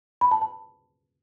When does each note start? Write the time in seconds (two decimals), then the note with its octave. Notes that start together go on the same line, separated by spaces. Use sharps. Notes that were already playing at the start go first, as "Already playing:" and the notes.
0.21 B5
0.31 A5
0.42 A5